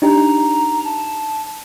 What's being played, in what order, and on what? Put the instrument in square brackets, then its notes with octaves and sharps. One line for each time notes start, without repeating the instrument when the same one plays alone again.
[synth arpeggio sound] D4 D#4 G4 [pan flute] A#5
[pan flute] A5